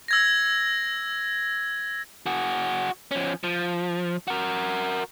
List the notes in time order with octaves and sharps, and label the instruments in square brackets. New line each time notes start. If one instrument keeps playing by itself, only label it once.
[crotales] E6 G#6 A#6
[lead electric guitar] F#4 G#4
F3 C#4
F3
F#4 A#4